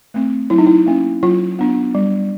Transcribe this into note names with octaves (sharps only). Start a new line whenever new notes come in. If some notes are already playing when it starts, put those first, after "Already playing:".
A3 C4
F#3 E4
D#4
E4
A#3 C#4
F#3 F4
B3 D4
G3